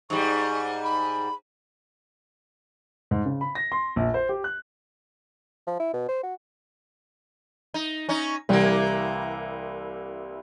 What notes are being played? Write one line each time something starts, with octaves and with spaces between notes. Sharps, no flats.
G#2 G3 C#6
B5
G#2
C#3
B5
A#6
C6
A#1
C5
G4
F#6
F3
E4
B2
C5
F#4
D#4
C#4 D#4
C2 E3 G3 A#3